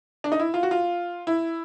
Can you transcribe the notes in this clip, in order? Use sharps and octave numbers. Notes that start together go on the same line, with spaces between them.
D4
D#4
E4
F4
F#4
F4
E4